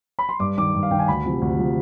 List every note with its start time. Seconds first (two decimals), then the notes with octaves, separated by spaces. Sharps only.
0.19 B5
0.29 C6
0.40 G2 D6
0.58 D#3 D6
0.75 G2
0.83 F5
0.91 D#3 G5
0.99 G#5
1.08 D2 B5
1.25 C3 F3
1.41 D2
1.59 C3 F3